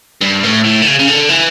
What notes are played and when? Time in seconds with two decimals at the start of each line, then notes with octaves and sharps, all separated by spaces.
0.21 G2
0.43 A2
0.64 A2
0.82 D3
0.86 C#3
0.99 C#3
1.08 D3
1.29 E3